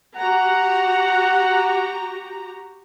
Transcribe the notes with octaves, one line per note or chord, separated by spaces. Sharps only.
F#4 G4 F#5 A#5